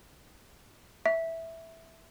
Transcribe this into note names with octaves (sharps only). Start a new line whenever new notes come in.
E5